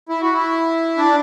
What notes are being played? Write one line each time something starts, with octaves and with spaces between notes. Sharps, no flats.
E4
F#4
E4
D4